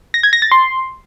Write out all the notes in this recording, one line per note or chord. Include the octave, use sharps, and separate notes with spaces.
A#6
G#6
A#6
A6
C6